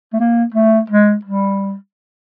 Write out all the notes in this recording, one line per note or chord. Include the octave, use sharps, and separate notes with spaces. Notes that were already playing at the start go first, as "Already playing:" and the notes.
A3
A#3
A3
G#3
G3